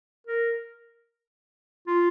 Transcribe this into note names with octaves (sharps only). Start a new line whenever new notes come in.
A#4
F4